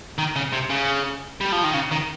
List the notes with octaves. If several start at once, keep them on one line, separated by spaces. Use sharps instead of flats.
D#3
C#3
C3
C#3
G3
F3
D#3
C#3
D#3